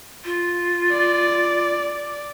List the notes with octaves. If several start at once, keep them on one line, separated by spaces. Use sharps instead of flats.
F4
D5